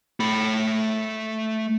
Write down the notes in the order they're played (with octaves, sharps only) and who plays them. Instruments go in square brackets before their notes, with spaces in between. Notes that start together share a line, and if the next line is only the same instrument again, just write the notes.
[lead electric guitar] A3 B5